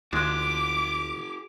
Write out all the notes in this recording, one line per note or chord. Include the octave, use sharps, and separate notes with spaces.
D2 F3 G#3 D4 F#4 G#4 D6